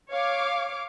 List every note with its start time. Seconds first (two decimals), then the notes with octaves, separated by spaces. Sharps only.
0.11 C#5 F5 D6